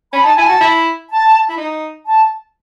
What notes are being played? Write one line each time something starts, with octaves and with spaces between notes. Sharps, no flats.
C#4 B5
D#4 A5
E4 G#5
F#4 A5
E4
A5
E4
D#4
A5